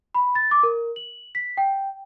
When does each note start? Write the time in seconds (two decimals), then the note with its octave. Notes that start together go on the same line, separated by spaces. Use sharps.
0.15 B5
0.35 A6
0.51 D6
0.63 A#4
0.96 F#7
1.35 B6
1.57 G5